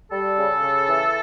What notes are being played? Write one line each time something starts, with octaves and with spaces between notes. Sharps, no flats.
G3 A4
C#3
C#3
E3